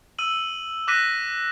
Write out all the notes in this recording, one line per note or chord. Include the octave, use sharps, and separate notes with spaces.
E6 D#7 F#7
D6 F#6 A#6 B6 D#7